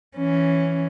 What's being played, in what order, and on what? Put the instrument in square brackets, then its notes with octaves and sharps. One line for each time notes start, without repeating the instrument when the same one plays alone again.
[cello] E3 C#4